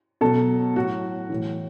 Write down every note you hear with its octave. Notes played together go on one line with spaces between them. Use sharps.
B2 F#3 A4
A2 F#3 F#4
A2 E3